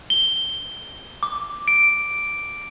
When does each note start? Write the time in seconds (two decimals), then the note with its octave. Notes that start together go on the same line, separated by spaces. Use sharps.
0.10 G7
1.23 D6
1.68 D7